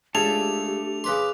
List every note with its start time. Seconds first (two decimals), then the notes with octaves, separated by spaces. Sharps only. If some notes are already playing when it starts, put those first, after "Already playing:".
0.15 C#2 A3 D4 G4 G#5 A5 F7
1.04 C#3 B4 C6 D6